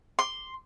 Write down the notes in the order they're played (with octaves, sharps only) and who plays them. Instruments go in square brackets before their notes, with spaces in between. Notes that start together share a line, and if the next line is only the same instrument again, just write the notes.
[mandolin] C6